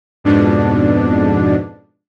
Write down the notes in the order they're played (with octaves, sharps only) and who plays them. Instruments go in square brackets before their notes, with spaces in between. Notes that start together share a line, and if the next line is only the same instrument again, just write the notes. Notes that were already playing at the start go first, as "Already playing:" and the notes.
[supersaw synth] F2 G#2 B2 D4